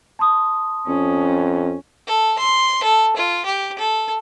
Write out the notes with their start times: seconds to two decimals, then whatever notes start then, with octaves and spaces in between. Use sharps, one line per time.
0.19 A5 C6 D#6
0.88 F2 C#4
2.07 A4
2.39 C6
2.83 A4
3.17 F4
3.46 G4
3.79 A4